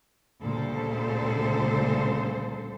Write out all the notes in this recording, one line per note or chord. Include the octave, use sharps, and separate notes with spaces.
D2 A#2 C#3 G3 A4 C5